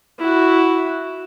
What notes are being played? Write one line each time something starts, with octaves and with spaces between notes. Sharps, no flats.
E4 F#4